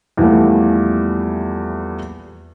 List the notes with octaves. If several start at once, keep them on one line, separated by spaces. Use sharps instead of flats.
E2 E3 F3 G3 A3 A#3